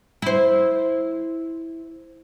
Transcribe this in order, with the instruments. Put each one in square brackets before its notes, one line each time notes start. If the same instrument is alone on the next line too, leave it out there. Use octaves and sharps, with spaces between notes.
[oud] E4 C5